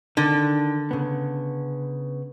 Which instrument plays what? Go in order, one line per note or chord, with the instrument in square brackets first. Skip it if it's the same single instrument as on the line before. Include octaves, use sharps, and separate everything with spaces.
[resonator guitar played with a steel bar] D3 [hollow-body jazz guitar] D#3
[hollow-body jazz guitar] C#3 B3